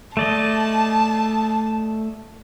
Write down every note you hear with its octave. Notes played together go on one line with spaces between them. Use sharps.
A3 D5 D#5 A5